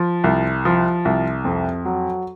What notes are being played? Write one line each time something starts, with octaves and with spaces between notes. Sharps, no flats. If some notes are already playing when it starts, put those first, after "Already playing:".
Already playing: F3
C2
F3
C2
F2
F#3